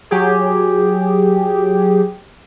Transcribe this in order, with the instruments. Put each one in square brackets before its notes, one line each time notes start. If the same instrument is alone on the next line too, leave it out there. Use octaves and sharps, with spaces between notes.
[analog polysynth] F#3 G4 G#4